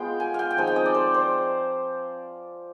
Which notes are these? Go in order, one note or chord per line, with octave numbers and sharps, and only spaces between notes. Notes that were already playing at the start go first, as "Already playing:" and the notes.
Already playing: G#3 B3 F4 G5
G#5
F5 G5
G5
F3 G#3 C4 D#4 G#5
G5
D#5
D5
C5
C5